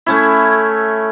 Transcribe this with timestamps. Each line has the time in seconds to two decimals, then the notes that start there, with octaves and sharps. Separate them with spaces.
0.06 A3 C#4 E4